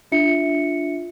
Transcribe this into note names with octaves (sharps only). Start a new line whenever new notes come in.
D4 F4 E5 C#7